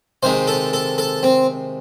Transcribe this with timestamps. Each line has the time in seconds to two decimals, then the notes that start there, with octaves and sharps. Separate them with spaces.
0.23 C3 D#3 G#3 C5
0.47 A4
0.73 A4
0.98 A4
1.23 C4